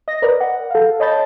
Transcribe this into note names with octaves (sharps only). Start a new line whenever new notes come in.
D#5 A#6
A#4 B4 D5
F#5
A4 F5
C#5 D#5 A5 B5 G6 A6